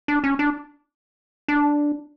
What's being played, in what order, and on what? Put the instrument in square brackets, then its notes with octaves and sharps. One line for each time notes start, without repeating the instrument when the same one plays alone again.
[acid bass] D4
C#4
D4
D4